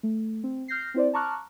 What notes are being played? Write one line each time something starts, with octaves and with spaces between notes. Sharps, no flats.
A3
C4
F6 G6 A#6 C7
C4 E4 C5 D5
A5 A#5 C#6 D6 F6 F#6